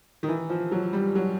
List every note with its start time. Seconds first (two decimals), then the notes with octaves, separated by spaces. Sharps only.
0.23 D#3
0.29 E3
0.49 F3
0.72 F#3
0.93 G3
1.15 F#3